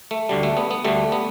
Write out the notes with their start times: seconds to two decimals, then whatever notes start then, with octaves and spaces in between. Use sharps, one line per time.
0.11 A3
0.29 D2 D3 G3
0.43 A3
0.57 B3
0.71 B3
0.85 D2 D3 G3 A3
1.12 B3